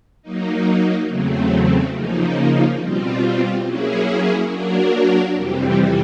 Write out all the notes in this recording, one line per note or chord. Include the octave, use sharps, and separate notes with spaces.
F#3 A#3 D#4
E2 C#3 F#3 A3 C4
C#3 F3 A#3 D#4
B2 G3 C4 F4
F#3 A#3 C#4 E4 G#4
F#3 A#3 D4 F#4 A#4
F2 C3 E3 G3 C4